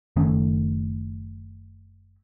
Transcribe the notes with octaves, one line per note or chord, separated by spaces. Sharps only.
F#1 D#3 A3 C#4